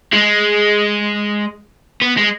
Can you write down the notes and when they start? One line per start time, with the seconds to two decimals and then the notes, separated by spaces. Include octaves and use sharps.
0.13 G#3
2.02 B3
2.17 G#3